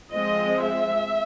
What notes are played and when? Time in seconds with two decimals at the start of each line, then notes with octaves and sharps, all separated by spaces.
0.12 F3 G#3 C4 D#5
0.62 E5